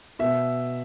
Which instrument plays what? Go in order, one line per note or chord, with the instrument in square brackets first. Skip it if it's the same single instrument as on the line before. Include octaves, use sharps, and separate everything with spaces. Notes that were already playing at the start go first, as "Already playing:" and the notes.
[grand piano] B2 E5